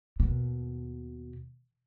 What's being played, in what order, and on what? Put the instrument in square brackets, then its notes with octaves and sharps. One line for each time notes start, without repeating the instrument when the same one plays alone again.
[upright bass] D#2 B2